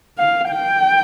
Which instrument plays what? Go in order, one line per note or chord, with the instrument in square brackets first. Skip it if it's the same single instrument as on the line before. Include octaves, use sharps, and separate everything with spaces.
[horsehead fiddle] F5
G5